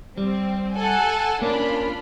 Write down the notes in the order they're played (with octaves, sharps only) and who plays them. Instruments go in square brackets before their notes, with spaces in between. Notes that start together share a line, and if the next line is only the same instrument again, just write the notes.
[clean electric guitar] G3 [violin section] C4
[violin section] A4 F#5 G#5
[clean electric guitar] A#3 C#4 [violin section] D4 F4 B5